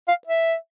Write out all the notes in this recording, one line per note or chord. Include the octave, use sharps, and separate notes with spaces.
F5
E5